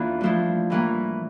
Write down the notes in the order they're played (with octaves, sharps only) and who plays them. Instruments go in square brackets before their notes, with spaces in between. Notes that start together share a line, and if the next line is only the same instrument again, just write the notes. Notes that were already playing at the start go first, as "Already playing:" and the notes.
Already playing: [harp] E2 E3 A#3 D4 F4
G2 F3 A3 E4
A2 E3 G3 A#3